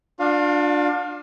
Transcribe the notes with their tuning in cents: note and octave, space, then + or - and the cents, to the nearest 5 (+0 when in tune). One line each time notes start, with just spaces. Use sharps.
D4 +10 F4 +45 F5 +10